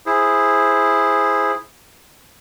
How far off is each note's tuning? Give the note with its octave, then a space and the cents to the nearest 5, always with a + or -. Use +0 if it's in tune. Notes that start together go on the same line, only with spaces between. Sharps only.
E4 +0 G#4 -5 C5 +0